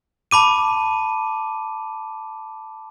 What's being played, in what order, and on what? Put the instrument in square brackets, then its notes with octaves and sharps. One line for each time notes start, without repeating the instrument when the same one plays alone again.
[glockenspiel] A5 B5 D6 D#7